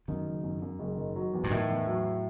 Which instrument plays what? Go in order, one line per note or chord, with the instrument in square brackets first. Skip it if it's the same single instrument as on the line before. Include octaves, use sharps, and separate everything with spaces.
[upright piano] F#2 [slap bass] D#3
[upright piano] F#1
F#2
F#2
F#1
D#3
F#3
E2
[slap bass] G2
[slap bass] A2 [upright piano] D#3
[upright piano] E2
F#3